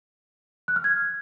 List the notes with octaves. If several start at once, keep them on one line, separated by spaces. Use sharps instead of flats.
F#6
F6
G#6